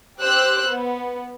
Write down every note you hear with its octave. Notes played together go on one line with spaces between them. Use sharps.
G4 C5 E6 F#6
B3